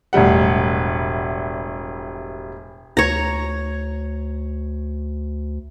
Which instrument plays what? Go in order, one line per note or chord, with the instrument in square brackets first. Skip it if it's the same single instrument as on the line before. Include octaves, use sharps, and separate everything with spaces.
[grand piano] E1 A2 G3 F#5
[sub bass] D2 [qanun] C#5 A#5